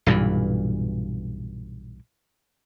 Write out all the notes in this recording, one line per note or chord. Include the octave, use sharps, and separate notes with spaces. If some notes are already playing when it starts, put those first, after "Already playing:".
B1 G2 A#2 E3